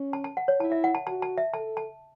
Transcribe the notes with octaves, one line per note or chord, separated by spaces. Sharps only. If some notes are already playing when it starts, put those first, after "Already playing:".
Already playing: C#4
A5
A5
F#5
C#5
E4 A5
E5
F#5
A5
F#4 A5
A5
E5
A4 A5
A5